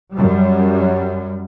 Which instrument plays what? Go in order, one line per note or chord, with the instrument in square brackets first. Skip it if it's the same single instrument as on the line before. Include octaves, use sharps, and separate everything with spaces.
[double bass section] F#2 G3